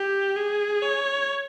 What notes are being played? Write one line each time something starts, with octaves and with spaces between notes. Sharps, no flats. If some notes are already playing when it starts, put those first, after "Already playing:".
Already playing: G4
G#4
C#5